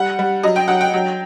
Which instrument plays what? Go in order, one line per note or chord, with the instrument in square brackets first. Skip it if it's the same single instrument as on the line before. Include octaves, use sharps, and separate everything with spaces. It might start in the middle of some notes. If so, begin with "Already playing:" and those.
Already playing: [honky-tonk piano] G3 F#5
G3
F#3 D#5
G5
F#3 F#5
G5
F#3